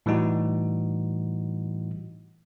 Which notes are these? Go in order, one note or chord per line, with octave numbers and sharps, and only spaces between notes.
A2 E3 G3 D#4 F#4